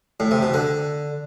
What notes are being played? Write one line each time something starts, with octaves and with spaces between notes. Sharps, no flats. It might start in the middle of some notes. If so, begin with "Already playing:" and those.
A2
C3
B2
D3